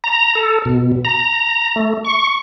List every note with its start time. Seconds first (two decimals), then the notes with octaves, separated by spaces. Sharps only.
0.04 A#5
0.35 A4
0.65 B2
1.05 A#5
1.76 A3
2.04 C#6